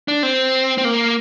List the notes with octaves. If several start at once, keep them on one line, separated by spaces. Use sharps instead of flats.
D4
C4
C4
A#3